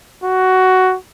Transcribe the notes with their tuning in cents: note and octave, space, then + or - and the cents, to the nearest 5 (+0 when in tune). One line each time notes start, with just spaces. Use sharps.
F#4 +10